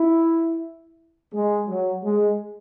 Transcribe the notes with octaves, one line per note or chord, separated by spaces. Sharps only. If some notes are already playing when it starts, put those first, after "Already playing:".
Already playing: E4
G#3
F#3
G#3